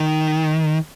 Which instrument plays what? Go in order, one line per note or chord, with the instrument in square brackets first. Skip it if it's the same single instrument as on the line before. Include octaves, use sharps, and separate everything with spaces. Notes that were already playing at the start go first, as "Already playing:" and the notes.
Already playing: [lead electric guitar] D#3